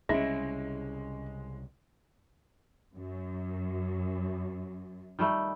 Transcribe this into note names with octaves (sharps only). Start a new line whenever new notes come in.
C2 C#3 G#3 C#4 E4 A#6
F#2
D#3 G3 A3